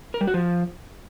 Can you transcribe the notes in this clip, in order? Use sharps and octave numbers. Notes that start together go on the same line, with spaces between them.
A#4
G3
F#4
F3